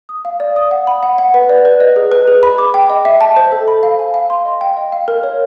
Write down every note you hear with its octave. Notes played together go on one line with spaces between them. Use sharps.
D#6
F5
D5
D#6
F#5
B5
F#5
F#5
B4
D5
B4
D#5
G#4
B4
G#4
B5
D6
G5
D#5
E5
A5
C5
A4
B5
F5
G#5
F5
C6
D#5
G5
D#5
F5
A#4
C#5